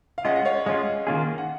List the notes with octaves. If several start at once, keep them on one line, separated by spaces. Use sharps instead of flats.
F5
G#3 C#4 F4 D#5 F#5
F#5
C#5 F5
G#3 C#4 F4 D#5 F#5
D#3 A#3 C#4 F4 G#4
F#5